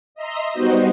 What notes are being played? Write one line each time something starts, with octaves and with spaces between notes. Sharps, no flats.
D#5 E5 A#5 C6 D#6
G3 B3 D#4 F#4 C5 D#5